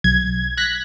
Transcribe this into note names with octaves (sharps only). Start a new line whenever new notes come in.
B1 G#6
F#6 A#6 B6